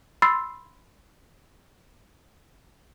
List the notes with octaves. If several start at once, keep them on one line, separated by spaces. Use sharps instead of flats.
B5 C6 E6 A6 C7